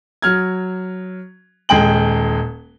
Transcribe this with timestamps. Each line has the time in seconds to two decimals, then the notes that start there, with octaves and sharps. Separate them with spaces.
0.22 F#3 F6 G#6
1.69 D#1 G#3 G5 F#7